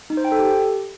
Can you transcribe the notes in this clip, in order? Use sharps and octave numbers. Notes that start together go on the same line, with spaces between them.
D#4
C5
G5
A4
G4